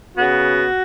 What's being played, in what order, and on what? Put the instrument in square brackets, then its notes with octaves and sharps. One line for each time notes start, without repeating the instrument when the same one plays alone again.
[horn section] C#3 B3 F#4